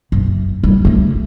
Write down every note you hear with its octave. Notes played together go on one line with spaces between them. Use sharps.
F#1
G3 E4
A3 C#4